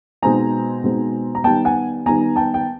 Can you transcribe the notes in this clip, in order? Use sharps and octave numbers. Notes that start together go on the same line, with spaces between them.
B2 G#3 C4 D#4 G#5 A#5
B2 G#3 C4 D#4
A#5
D#3 G3 B3 G5 A5
F#5 G#5
D#3 G3 B3 G#5 A#5
G5 A5
G5